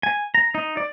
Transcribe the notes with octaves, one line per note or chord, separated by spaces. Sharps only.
G#5
A#5
D#4
D5